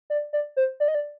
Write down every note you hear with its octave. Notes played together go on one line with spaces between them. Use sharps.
D5
D5
C5
D5
D#5
D5